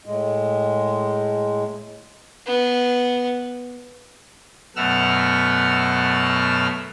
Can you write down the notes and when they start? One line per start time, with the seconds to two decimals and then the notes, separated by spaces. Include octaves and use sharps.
0.06 A2 G#3
2.47 B3
4.76 F#2 B2 A3 F#5 E6 F6